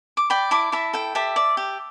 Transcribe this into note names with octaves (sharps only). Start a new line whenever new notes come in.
D6
D5 G5 B5
E4 A5 D6
E4 E5 A5
A4 G5
G4 E5 A5
D5
G4